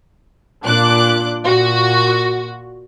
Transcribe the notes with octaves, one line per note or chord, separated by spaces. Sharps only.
A#2 D4 D6 F#6
A#2 F#4